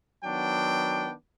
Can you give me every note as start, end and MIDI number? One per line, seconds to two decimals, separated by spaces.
0.25 1.12 51
0.25 1.12 54
0.25 1.12 59
0.25 1.12 62
0.25 1.12 79